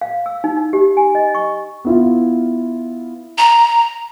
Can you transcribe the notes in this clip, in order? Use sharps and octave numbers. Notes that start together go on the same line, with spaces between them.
F5
E6
D#4
D#4
G4
G#5
D#5
C#6
B3 E4 F4
A#5